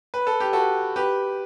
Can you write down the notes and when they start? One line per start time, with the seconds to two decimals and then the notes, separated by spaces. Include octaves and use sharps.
0.14 B4
0.27 A4
0.40 G4
0.53 F#4 A4
0.96 G4 B4